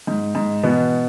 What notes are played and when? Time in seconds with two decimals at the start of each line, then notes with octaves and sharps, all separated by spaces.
0.07 G#2
0.35 G#2
0.63 B2 E3 B3